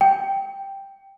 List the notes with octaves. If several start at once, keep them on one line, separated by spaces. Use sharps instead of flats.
G5